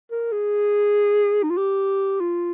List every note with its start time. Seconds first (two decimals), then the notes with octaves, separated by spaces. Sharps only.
0.11 A#4
0.32 G#4
1.43 D#4
1.50 F4
1.57 G4
2.20 F4